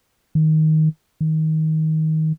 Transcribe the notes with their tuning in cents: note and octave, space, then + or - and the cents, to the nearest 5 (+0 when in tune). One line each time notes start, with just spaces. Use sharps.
D#3 +10
D#3 +20